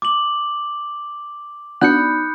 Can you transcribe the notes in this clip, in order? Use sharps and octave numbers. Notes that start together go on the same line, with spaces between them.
D6 F#7
B3 D4 D#4 F#4 B5 F#6 G6 C#7